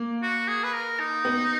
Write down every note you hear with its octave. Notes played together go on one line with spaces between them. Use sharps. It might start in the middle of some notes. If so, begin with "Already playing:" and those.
Already playing: A#3
F#4
G#4
B4
A#4
D#4
B3